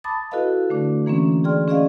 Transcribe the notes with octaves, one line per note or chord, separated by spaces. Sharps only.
A5 B5 D6 D#6 A6
E4 F#4 A4 B4 D#5 F5
D3 A3 D4
E3 A#3 C4 C#4
G#4 D5 G5 C6 F6
C#4 G#4 D5 D#5 F5